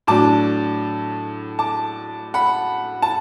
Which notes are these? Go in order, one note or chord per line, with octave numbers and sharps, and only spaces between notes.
A2 F#3 D4 A5 D6
A5 D6
F#5 B5
A5